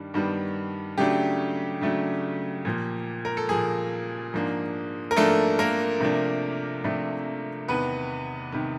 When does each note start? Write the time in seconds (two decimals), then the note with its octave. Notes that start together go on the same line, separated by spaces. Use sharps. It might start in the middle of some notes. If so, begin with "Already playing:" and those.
Already playing: G2 D#3 G3 D4
0.14 G2 D#3 G3 B3 D4
0.98 C#3 F#3 A3 D4 G4
1.81 C#3 F#3 A3 D4
2.65 A#2 F3 A#3
3.25 A#4
3.37 A4
3.49 A#2 F3 A#3 G#4
4.34 G#2 F3 A#3 D4
5.11 A#4
5.16 G#2 F3 A3 A#3 D4 A4
5.59 A#3 A#4
6.00 C3 F3 A3 D4
6.84 C3 F3 A3 D4
7.68 E2 C3 D#3 B3 B4
8.52 C3 D#3